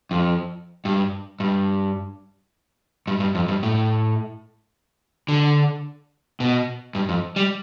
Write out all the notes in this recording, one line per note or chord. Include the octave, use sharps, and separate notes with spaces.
F2
G2
G2
G2
G2
F2
G2
A2
D3
B2
G2
F2
G3